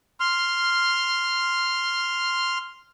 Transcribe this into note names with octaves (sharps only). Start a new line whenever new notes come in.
C6 F6